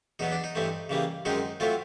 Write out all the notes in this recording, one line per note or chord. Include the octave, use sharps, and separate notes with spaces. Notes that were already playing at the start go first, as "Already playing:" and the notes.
E2 B2 F#3 B3 D#4
D4
D#4
G2 E3 A3 C4
C#3 E3 G3 A#3
F#2 D#3 G#3 C4 D#4
A2 F#3 A3 C4 F4